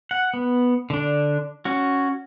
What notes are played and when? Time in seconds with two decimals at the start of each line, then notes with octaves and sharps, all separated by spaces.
0.11 F#5
0.34 B3
0.90 D3 D4
1.65 C#4 F#4